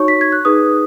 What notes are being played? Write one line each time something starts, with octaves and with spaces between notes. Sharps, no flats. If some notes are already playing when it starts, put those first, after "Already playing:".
Already playing: D#4 F#4 C#5 C#6
B6
G#6
F#6
D#4 G#4 B4 D#6